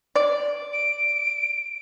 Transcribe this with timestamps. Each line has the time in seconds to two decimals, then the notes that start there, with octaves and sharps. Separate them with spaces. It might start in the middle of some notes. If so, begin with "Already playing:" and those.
0.16 D5
0.73 D7